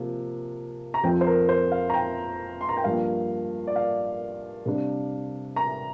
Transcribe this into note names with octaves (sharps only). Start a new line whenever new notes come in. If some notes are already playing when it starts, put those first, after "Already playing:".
Already playing: C3 F3 A#3
A#5
F2 F3 C4 G5
C5
A#4
C5
F5
A#5
G5
C6
A#5
G5
G2 F3 A#3 F5
D5
F5
C3 G3 D4
A#5